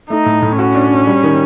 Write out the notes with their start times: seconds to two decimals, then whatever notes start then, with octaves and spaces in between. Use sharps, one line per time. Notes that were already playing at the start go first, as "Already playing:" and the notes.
0.10 A3 D#4
0.26 A2
0.42 A2
0.59 C#4 F#4
0.75 D4
0.91 D4
1.07 G3
1.24 D#3